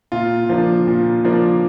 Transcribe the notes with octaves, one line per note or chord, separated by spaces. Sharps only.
A#2 F4
F3 A#3 D4
A#2
F3 A#3 D4